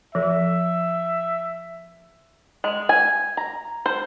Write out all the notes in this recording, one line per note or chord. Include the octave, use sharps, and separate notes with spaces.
F3 A4 E5
G#3
G#5
A#5
C5